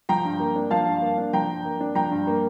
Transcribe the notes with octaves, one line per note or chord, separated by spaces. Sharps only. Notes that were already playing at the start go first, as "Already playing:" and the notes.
F3 G5 A#5
G2
A#3
D4
F3 F5 A5
G2
A#3
D4
F3 G5 A#5
G2
A#3
D4
F3 G5 A#5
G2
A#3